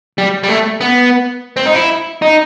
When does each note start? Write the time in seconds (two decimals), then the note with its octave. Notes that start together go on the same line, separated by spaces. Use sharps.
0.18 G3
0.43 G3
0.49 A3
0.81 B3
1.56 C4
1.66 D#4
1.74 E4
2.22 D#4